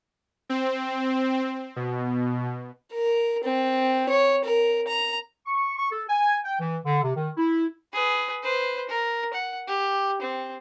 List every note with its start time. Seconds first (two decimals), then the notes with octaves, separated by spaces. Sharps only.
0.49 C4
1.76 B2
2.94 A#4
3.44 C4
4.09 C#5
4.45 A#4
4.88 A#5
5.45 C#6
5.77 C#6
5.90 A4
6.09 G#5
6.44 G5
6.60 E3
6.84 D3
7.02 C3
7.15 D#3
7.37 E4
7.93 G#4 B4
8.43 B4 C5
8.89 A#4
9.33 F#5
9.67 G4
10.22 C4